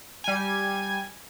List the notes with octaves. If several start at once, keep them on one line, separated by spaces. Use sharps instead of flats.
G3 G#5